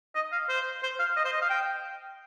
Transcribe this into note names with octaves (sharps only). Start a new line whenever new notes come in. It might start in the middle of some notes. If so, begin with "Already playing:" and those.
D#5
F5
C5
C5
F5
D#5
C5
D#5
F5
G5